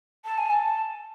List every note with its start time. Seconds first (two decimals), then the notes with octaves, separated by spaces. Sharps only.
0.25 A5
0.38 G#5
0.50 A5